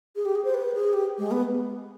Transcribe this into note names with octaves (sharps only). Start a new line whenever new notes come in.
G#4
G4
G#4
C5
B4
G#4
G4
G#3
B3